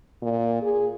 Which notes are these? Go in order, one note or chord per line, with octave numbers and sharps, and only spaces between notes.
A#2
G#4